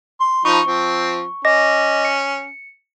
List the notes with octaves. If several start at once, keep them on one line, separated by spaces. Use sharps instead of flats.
C6
F3 D#4 B5 C#6
F3 C4
C#4 D#5 D6 A#6
C#7